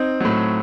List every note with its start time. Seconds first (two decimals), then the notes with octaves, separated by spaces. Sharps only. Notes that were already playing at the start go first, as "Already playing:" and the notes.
Already playing: C4 D#4
0.20 A2 F#3